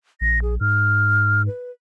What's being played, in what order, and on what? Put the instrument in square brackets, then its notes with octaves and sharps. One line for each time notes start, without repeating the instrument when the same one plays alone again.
[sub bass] A#1 [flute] A#6
[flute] G#4
[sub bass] G#2 [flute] F6
[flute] B4